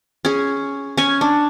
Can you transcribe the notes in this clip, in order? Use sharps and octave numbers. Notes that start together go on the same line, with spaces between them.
C#4 G#4
C#4 G#5
D4